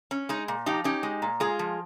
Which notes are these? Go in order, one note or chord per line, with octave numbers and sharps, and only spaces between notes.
C#4
G#3 D#4
A#2
F3 D#4 G4
C#4 D#4 G4
G#3
A#2
G#3 F4 G#4
F3